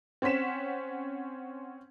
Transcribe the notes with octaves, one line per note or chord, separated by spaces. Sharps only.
C4 C#4 F#5 B6 E7